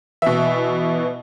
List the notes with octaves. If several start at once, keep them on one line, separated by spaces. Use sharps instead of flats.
B2 E3 E5